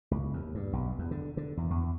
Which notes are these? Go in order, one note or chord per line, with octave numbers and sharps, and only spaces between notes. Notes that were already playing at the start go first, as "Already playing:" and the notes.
C#2
D#2
G2
B1
E2
D3
D3
E2
E2